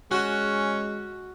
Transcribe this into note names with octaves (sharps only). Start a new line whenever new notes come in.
G#3 C#4 F#4